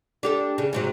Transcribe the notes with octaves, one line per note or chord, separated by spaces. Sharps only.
D4 G4 A4
C#3
G#2 C3 F#3